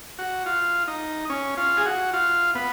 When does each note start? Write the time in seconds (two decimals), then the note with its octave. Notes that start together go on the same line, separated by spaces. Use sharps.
0.19 F#4
0.46 F4
0.88 D#4
1.30 C#4
1.57 F4
1.77 G#4
1.86 F#4
2.14 F4
2.55 B3